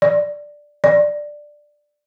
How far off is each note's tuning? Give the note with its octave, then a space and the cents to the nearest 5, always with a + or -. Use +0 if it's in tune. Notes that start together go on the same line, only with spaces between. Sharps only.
D5 +5
D5 +10